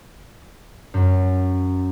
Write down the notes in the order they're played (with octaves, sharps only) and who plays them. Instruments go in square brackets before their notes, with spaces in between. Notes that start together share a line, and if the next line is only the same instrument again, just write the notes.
[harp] F#2